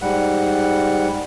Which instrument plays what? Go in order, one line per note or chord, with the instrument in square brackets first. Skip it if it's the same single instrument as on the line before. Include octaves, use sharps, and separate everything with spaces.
[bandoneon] G#2 G3 F#5